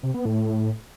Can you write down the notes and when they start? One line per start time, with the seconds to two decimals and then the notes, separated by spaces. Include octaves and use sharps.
0.03 C3
0.14 B3
0.26 A2